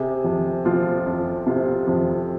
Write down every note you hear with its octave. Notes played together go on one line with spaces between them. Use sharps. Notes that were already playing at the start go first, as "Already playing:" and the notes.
Already playing: C3 G#4
F2
F3 F4
F2
C3 F4
F2